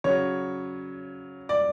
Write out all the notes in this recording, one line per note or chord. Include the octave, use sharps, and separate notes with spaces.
C#3 F#3 C#5
D5